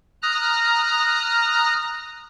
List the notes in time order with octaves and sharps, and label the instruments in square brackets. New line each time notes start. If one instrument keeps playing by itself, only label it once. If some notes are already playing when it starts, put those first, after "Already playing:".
[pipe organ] A#5 D#6 F6 F#6 A#6